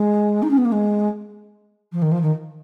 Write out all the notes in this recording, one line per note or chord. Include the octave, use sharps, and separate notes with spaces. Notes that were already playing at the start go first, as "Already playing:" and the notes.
Already playing: G#3
D#4
C#4
B3
A#3
G#3
F3
D#3
F3
D#3